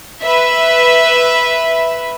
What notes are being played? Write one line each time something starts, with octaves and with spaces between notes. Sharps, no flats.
B4 E5